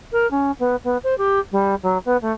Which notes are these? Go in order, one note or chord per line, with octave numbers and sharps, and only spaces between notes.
A#4
C#4
B3
B3
C5
G4
G3
F#3
B3
A3